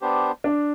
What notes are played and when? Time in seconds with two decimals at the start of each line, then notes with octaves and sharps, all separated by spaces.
0.01 B3 D4 G4 C5
0.44 D4